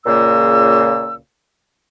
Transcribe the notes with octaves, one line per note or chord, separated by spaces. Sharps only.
C#2 A#2 C#3 A#3 E6